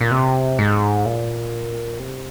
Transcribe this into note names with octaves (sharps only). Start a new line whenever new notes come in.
A#2
C3
G#2
A#2
C3